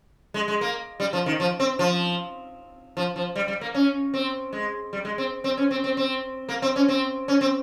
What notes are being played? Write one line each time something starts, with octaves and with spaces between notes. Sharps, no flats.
G#3
G#3
A#3
G3
F3
D#3
F3
C4
F3
F3
F3
G3
G3
A#3
C#4
C4
G#3
G3
G#3
C4
C4
C#4
C4
C4
C4
A#3
C4
C#4
C4
C#4
C4